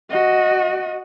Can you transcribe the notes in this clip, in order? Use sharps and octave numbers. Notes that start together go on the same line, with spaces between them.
F#4 D#5